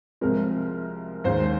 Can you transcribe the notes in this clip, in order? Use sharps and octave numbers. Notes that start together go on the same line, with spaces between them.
C2 C3 F3 G#3 A#4
D#2 D#3 G#3 C5